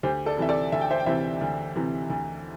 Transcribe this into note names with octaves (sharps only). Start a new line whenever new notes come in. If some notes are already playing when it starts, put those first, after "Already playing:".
D2 G4 C5
A4 D5
C3 E3 E5
A4 D5
D2 E5
G5
C5 E5
G5
C3 E3 C5 E5
D2
C3 E3
D2